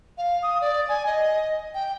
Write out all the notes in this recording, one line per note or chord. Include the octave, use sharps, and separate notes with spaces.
F5
D#6
D5
G#5
D#5
G5